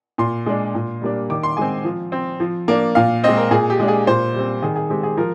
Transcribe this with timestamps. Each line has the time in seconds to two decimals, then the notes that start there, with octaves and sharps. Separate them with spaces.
0.18 A#2 C6
0.46 G#3 D4
0.75 A#2
1.02 G3 A#3 D4
1.30 D#3 D6
1.43 C6
1.57 G#3 C4 G#5
1.84 F3
2.12 C4
2.40 F3
2.68 A#3 D4
2.95 A#2 F5
3.24 G#3 C4 D#5
3.37 A#4
3.51 A#2 G#4
3.70 G4
3.80 G#3 D4
3.88 G#4
4.07 A#2 C5
4.34 G3 C4
4.62 D#3 G#4
4.76 G#4
4.90 G#3 C4 G4
5.03 G#4
5.17 F3 A#4